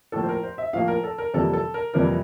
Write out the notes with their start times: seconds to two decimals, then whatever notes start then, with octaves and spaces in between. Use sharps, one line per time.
0.12 A2 F3 A#3 A4
0.23 C5
0.29 A#4
0.43 C5
0.58 E5
0.73 A2 F3 A#3 F5
0.88 A#4
1.04 A4
1.18 A#4
1.34 F2 C3 E3 G3 A#3 A4
1.53 A4
1.74 A#4
1.94 F2 C3 E3 G3 A#3 A#4